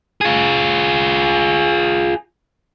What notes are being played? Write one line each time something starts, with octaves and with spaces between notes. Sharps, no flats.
F4 G#4